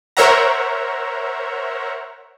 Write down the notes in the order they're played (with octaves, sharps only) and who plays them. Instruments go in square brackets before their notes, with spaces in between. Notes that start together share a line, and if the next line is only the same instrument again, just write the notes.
[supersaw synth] A#4 C5 C#5 E5 F#5 A#5